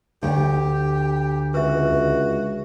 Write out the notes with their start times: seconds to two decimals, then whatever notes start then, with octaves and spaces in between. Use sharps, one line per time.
0.23 D2 G4
1.54 C#2 F#4 B4 E5